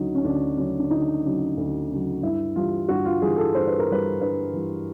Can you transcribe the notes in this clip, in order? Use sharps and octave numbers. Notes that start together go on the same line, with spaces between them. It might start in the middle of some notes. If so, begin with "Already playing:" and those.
Already playing: D2 C#3 F#3 D#4
C#4
D2 D4
C#3 F#3 C#4
D4
D2 D#4
C#3 F#3
D2
C#3 F#3
G2 E4
E3 G3 F4
G2 F#4
F4
E3 G3 G#4
A4
G2 C5
B4
A#4
E3 G3 B4
G2 B4
E3 G3